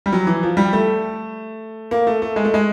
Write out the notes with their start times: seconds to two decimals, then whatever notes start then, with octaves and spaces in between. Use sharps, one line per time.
0.06 G3
0.13 F#3
0.27 E3
0.43 F3
0.57 G3
0.73 A3
1.91 A#3
2.07 A3
2.22 A3
2.36 G#3
2.45 A3
2.54 G#3